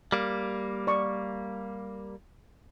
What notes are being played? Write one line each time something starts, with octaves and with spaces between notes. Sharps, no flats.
G3 A#3
D5 C#6